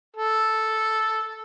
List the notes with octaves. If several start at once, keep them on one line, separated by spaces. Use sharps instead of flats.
A4